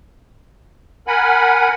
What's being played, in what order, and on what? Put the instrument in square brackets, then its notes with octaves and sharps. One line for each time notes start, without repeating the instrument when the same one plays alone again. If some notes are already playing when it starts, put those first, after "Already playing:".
[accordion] A#4 F#5 G#5 B5